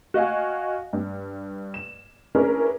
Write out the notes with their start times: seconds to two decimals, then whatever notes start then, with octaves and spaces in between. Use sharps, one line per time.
0.14 F#4 D#5 F5 G#5
0.93 G2
1.74 E7
2.35 C#4 D4 E4 G#4 A#4 B4